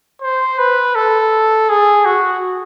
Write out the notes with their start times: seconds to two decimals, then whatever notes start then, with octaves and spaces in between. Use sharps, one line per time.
0.22 C5
0.59 B4
0.95 A4
1.70 G#4
2.06 F#4